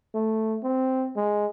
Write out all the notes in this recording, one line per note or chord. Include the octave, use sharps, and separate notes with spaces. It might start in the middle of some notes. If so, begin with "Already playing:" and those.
A3
C4
G#3